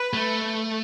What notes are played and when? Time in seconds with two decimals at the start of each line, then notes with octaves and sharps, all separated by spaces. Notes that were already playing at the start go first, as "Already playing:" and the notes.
Already playing: B4
0.13 A3